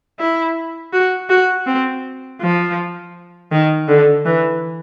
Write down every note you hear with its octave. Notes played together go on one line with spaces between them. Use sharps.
E4
F#4
F#4
C4
F3
D#3
D3
E3